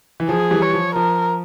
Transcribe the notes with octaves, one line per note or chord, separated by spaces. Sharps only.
E3
F3 G#4
E3 G3
C#5
F3
F3 A#4